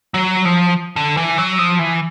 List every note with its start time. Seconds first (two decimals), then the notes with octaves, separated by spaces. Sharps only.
0.14 F#3
0.45 F3
0.96 D3
1.17 E3
1.38 F#3
1.59 F3
1.79 E3